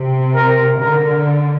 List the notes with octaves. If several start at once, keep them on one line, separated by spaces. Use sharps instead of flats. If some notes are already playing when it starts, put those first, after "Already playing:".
Already playing: C3
A#4
D3 A#4